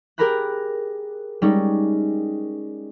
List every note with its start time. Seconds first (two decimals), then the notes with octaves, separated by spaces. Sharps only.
0.18 G4 G#4 A#4 A#5 B5 F#6
1.42 G3 G#3 C#4 D#4